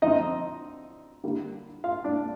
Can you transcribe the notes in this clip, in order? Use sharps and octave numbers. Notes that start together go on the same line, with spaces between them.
D3 F3 C4 D#4 D#5
D3 G3 A#3
F4 F5
D4 D5